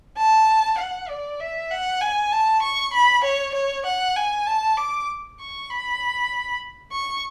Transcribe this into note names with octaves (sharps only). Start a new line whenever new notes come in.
A5
F#5
D5
E5
F#5
G#5
A5
C#6
B5
C#5
C#5
F#5
G#5
A5
D6
C#6
B5
C#6